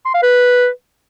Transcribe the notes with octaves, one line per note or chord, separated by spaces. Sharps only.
C6
F5
B4